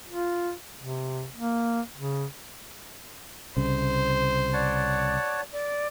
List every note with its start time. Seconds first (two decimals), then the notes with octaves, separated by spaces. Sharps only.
0.08 F4
0.79 C3
1.36 A#3
1.96 C#3
3.57 C2 C#3 C5
4.53 C#5 D5 F#5 A5
5.52 D5